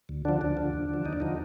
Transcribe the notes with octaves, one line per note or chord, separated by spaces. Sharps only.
D2
D3 F3 D4
D2 D4
D3 F3
D#2
D3 F3
D#2 D#4
D4
D3 F3 D#4